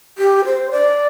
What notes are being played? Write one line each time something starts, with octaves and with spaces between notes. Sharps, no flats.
G4
C5
D5